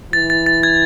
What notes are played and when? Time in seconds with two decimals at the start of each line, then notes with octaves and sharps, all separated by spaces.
0.13 E3 A6
0.30 A6
0.46 A6
0.63 G#6